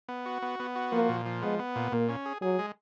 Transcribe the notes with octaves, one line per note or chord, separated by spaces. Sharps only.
B3
F#4
B3
B3
F#4
F3 A#3
A#2
F3
G#3 B3
B3
A#2
A#2 A#3
C#4
G#4
F#3 G#4
G#3